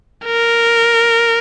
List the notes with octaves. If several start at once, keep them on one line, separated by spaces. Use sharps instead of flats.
A#4